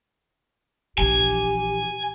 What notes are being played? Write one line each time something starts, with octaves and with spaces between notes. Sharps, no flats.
A#1 E3 G4 G#5